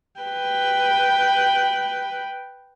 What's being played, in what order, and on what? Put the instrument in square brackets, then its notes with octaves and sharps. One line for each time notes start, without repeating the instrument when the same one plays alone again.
[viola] B4 G5